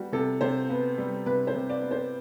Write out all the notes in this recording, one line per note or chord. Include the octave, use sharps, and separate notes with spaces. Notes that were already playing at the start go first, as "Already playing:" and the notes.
Already playing: G3 B3 F#4
C3 A4
C3 C5
B3
G3
C3 B4
C5
C3
D5
B3
C5